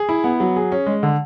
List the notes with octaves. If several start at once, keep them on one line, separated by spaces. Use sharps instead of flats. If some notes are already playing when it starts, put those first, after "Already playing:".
Already playing: G#4
E4
B3
F#3
G#4
C#4
G#3
D3